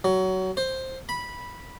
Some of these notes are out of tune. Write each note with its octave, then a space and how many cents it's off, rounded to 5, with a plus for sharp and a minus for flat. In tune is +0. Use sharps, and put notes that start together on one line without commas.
F#3 +20
C5 +5
B5 -10